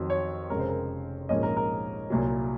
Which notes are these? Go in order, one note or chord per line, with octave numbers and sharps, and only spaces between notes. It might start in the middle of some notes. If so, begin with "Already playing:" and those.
Already playing: F2 D#3 F#3
C#5
F1 F2 C#3 G#3 C#4 A#4
C5
A#4
A#1 G#2 F3 A#3 C#4 D#5
A#4
A#4
C2 A#2 F#3